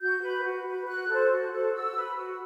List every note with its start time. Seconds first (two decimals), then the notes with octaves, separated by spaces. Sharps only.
0.01 F#4 G6
0.23 B4
0.44 F#4
0.66 B4
0.87 F#4 F#6
1.09 A4 C5
1.31 F#4
1.52 A4 C5
1.73 F#4 E6
1.95 B4
2.16 F#4